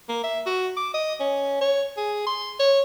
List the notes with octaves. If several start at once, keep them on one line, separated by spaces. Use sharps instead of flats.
A#3
E5
F#4
D6
D#5
C#4
C#5
G#4
C6
C#5